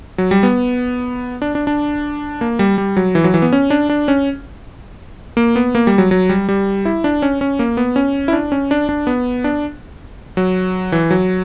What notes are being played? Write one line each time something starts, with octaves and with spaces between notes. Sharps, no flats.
F#3
G3
B3
D4
D4
D4
A#3
G3
G3
F#3
E3
F#3
E3
B3
C#4
D4
D4
C#4
A#3
B3
A#3
G3
F#3
F#3
G3
G3
E4
D4
C#4
C#4
A#3
B3
C#4
E4
D4
C#4
D4
D4
B3
D4
F#3
E3
F#3